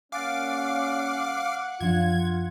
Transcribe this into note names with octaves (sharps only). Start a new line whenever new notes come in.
G3 A#3 C#4 F5 F#5 G#5 D6 A6
F#2 F3 D4 F4 G#6